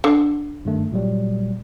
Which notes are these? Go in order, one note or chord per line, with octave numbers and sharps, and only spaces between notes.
D3
G2 D#3 A3
A#2 F#3 G3